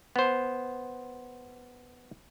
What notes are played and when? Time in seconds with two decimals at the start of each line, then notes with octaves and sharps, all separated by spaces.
0.16 B3 C5